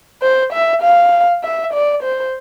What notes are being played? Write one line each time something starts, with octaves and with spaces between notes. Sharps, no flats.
C5
E5
F5
E5
D5
C5